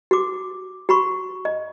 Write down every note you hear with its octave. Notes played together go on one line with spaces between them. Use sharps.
F#4 D6
F#4 B5 C#6
D#5